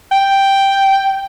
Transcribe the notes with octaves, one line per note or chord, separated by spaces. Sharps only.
G5